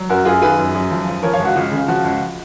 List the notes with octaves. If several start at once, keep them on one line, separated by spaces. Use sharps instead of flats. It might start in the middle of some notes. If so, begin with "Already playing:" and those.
Already playing: F#3
F#2 F#4 A#4
F#2 F4 G#4
D#3 G#4 B4
F#2
F#2
F3
F3
F3 A#4 C#5
C#5 F5
C#2
F#4
C#2 F4
C#3
F3 F#4
C#2